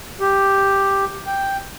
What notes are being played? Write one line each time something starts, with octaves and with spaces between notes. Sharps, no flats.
G4
G5